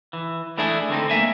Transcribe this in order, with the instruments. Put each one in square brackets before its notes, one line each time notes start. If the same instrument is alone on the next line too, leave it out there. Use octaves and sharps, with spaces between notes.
[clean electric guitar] E3
E3 A3 D4 E4 G#4
D3 A3 C4 D#4
A3 A#3 E5 G#5